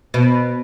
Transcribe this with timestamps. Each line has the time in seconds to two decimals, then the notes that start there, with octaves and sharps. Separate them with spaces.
0.14 B2